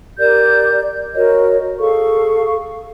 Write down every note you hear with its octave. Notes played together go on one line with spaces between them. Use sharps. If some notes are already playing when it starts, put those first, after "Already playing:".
G4 A#4 D5 G6
F#4 A#4 C#5 D#5
G#4 A4 F5 C#6